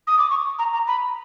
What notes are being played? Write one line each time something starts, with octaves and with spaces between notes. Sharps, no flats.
D#6
D6
C#6
A#5
A#5
B5